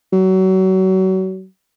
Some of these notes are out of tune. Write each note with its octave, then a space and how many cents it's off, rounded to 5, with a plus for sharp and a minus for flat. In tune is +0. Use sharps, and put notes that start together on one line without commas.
F#3 +30